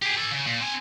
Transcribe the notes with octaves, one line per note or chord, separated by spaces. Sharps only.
G4 G#4
A4 G#5
C#3
A#2
C4 G#5